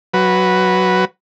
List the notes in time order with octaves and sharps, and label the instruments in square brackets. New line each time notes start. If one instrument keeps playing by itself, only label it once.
[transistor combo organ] F#3 B4